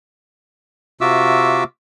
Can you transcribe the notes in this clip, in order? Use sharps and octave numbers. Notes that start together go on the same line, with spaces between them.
C3 F4 F#4 E5 D6 E6